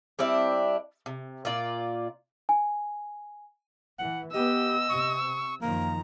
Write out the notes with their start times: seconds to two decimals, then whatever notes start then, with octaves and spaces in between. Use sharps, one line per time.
0.19 G3 C4 D4 E4
1.06 C3
1.45 A#2 F4 D5
2.49 G#5
3.99 E3 F#5
4.34 B3 G4 D#5 E6
4.89 C3 C#6
5.62 F#2 D#3 F3 A#3 A#5